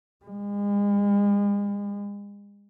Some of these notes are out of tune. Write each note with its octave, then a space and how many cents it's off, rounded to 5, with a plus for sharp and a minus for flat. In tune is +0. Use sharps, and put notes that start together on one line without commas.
G#3 -40